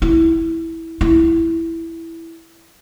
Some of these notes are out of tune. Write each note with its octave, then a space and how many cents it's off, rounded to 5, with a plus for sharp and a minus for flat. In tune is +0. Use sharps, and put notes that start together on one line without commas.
E4 -10
E4 +0